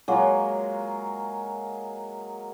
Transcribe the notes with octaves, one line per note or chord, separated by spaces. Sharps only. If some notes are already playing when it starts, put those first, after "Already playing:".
F#3 G#3 A#3 F4